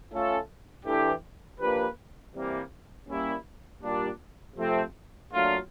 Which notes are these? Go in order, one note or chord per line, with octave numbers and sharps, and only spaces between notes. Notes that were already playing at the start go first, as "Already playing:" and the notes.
A3 C#4 F4 A4
E3 A3 D4 G4
F3 A#3 D4 G4 B4
C3 E3 G3 A#3
G3 A#3 C#4 E4
A#2 G3 A#3 D4
C3 F3 A3 C4
A#2 F#3 A3 D4 F4